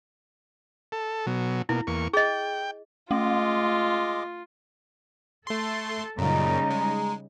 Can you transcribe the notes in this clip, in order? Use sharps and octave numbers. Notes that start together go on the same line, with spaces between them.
A4
B2 F#3
B2 A#3 E4
E2 A#3 C#6
G#4 D#5 G5
G#3 A3 F4 D#5 D6
A3 A4 C6
F#2 A#2 C#3 G3 D#4 A#5
G#3